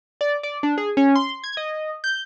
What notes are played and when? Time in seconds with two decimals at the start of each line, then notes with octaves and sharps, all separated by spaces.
0.21 D5
0.43 D5
0.63 D4
0.78 G#4
0.97 C#4
1.15 C6
1.44 G#6
1.57 D#5
2.04 G6